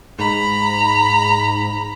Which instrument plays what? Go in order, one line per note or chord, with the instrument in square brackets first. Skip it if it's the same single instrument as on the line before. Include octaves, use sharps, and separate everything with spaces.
[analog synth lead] G#2 [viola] A#5 B5